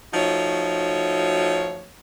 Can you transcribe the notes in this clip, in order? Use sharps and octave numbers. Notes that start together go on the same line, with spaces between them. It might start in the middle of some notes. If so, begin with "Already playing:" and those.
F3 A3 D#4 F#4 C#5